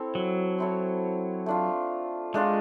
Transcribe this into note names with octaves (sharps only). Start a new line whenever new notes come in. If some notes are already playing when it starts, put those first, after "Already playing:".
Already playing: C4 E4 A4 C#5
F#3
C4 E4 A4 C#5
A3 D4 F4
G#3 A3 D4 F4